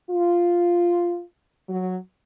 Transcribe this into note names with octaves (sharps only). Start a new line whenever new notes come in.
F4
F#3